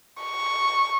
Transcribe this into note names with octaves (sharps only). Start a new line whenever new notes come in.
C#6